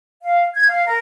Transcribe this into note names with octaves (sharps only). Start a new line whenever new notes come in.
F5
G#6
F5
A#4